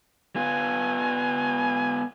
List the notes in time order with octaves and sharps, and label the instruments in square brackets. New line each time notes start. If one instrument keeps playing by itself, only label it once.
[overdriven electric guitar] B3 F4 [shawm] G#5